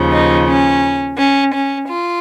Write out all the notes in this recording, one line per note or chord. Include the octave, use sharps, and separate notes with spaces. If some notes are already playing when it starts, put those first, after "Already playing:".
Already playing: D#2 C#3 F3
D#4
C#4
C#4
C#4
F4